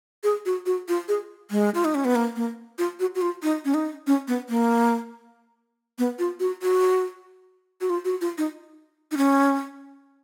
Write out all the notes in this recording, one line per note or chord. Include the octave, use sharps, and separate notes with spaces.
G#4
F#4
F#4
F4
G#4
G#3
F4
D#4
C#4
B3
A#3
A#3
F4
F#4
F#4
F4
D#4
C#4
D#4
C#4
B3
A#3
B3
F4
F#4
F#4
F#4
F4
F#4
F4
D#4
D#4
C#4